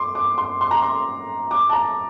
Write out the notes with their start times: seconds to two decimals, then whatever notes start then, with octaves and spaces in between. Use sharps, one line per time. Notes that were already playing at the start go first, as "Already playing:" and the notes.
Already playing: C6 D6
0.15 D6
0.38 C6
0.61 C6
0.71 A#5
0.82 C6
1.51 D6
1.69 A5
1.73 A#5